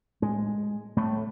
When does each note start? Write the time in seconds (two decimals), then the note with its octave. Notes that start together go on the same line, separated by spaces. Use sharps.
0.22 A2 G#3
0.96 A2 A3